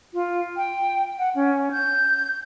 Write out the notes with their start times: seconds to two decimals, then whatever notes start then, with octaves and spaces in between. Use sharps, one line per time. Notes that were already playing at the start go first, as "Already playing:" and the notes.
0.14 F4
0.57 G5
1.19 F#5
1.35 C#4
1.72 G6